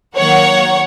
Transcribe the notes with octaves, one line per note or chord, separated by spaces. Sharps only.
D#3 F#3 A#3 C#5 F#5